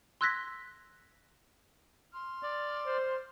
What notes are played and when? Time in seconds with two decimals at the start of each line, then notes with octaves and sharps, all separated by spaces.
0.21 C6 E6 F#6 G#6 A#6 B6
2.12 C6 F6
2.43 D5
2.86 C5